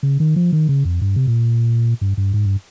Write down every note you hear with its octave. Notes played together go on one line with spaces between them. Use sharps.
C#3
D#3
F3
D#3
C#3
F2
G2
C3
A#2
G2
G2
G#2
G2